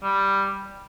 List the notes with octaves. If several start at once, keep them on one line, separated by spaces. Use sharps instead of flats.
G3